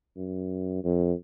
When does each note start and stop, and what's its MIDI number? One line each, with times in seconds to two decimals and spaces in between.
0.17 0.80 42
0.84 1.13 41